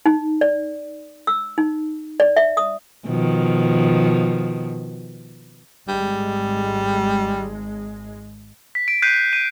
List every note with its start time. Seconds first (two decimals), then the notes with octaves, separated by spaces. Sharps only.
0.06 D#4
0.41 D5
1.27 E6
1.58 D#4
2.20 D5
2.37 E5
2.57 D#6
3.06 B2 D#3 F3
5.88 G#1 G3 G#3
8.75 B6
8.88 D7
9.02 F#6 G6 B6 C7 D#7
9.33 D#7